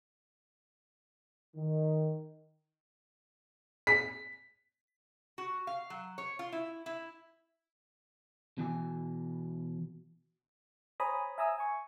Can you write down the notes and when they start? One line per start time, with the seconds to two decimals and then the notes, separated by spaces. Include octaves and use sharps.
1.56 D#3
3.87 B6
5.38 F#4
5.67 F5
5.90 F#3
6.18 C#5
6.39 F4
6.52 E4
6.86 E4
8.58 B2 E3 G#5
11.00 C5 C#5 G#5 A#5 B5 D#6
11.38 E5 G#5 A#5 D#6 E6
11.58 G#5 C#6